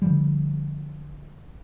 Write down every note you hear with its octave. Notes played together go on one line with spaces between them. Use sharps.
D3 F3 G3